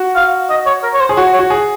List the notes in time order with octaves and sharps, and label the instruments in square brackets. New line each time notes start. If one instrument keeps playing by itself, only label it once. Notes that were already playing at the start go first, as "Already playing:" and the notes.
Already playing: [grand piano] F#4
[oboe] F5
D#5
C#5
A#4
C#5
C5
[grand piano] G#4
[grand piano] F#4 [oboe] C#5
[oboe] C#5
[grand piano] F#4
G#4